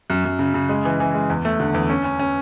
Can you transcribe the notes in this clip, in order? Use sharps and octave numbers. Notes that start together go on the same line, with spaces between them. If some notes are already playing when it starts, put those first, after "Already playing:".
F#2
F#2
C#3
C#3
G#3
E3
E3
G#3
E2
A3
D3
E2
C#4
C#4
C#4